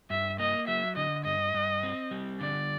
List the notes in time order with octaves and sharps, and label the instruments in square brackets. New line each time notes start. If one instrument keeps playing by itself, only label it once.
[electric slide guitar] G2 [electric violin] E5
[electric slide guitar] A#3 [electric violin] D#5
[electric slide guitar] F#3 [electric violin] E5
[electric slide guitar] D3 [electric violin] D#5
[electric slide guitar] G2 [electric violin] D#5
[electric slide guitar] G2
C4
G3
[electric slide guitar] D3 [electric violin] D5